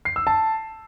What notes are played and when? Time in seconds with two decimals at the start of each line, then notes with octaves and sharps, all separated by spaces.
0.05 C7
0.16 E6
0.27 A5